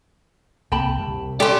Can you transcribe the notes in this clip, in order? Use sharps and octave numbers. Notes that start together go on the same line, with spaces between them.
C2 A#3 C4 G5 A5 B5
C2 C3
C#4 G4 A4 D5 C6